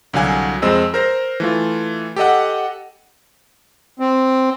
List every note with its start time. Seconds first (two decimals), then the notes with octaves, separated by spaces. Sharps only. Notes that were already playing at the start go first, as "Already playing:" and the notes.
0.13 C2 D3 F#3 F5 G#5
0.62 F2 G#3 C4 D#5 E6
0.94 A#4 C5 A#6
1.40 E3 A3 F4
2.16 G4 A4 D#5 F#5
3.99 C4